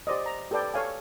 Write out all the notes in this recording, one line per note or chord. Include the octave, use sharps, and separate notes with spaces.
G4 C5 D5 D#5
A#5
G4 A4 B4 D5 G5
A4 C#5 F5 G#5